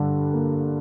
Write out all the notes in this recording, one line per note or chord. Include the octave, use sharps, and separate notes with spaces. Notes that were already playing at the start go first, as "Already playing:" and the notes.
Already playing: G2 D3 G3
A#3